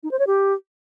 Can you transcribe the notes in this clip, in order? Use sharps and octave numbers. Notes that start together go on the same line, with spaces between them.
D#4
C5
C#5
G4